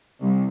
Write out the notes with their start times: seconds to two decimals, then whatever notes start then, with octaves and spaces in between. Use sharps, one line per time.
0.21 C2